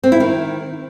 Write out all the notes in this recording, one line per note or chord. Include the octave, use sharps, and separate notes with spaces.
C4
E4
D#3